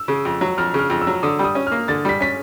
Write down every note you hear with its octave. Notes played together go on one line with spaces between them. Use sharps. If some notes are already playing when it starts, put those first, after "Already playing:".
Already playing: E6
C#3
F2
F#3
F2 F6
C#3 F6
F2
E6
F#3
D3 D#6
G3
D#6
C#4
A#3 F6
D3 A6
G3 B6
C#4 B6